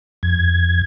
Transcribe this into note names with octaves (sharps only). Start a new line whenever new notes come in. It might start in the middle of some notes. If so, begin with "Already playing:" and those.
F2 G#6